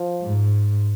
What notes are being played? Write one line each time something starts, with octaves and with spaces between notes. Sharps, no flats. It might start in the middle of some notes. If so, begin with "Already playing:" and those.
Already playing: F3
G#2